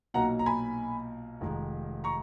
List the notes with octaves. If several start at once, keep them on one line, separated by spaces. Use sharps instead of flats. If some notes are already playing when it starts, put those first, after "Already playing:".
B1 A#2 F#3 A#3 D#4 F#5 A#5
A#5
G#5 B5
F1 F2 D#3 G#3
A#5 C#6